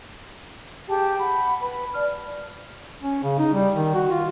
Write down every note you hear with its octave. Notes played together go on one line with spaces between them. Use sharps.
G4 G#4 G5 A5
F#5 B5
B4 B5
D5 A5 F6
C#4
C#3
D#4
G3
D#3
F#4
F4